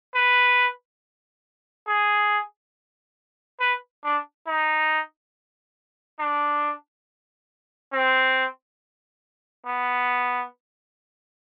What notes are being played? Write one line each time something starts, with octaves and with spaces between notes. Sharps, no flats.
B4
G#4
B4
D4
D#4
D4
C4
B3